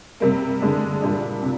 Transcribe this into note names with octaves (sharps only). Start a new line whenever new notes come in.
C3 G3 A#3
D3 G#3 D4
A#2 G3 D4
C3